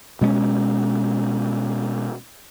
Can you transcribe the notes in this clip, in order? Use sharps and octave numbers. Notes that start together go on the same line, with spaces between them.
B2 G#3 A3 C#4